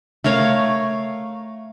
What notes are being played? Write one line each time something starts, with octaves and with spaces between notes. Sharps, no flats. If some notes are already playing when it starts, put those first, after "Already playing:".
A3 A#4 C#5 F5